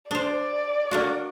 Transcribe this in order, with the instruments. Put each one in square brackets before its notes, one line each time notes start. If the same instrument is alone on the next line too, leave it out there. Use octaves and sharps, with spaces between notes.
[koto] D4 C5 [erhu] D5
[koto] A#3 D4 F#4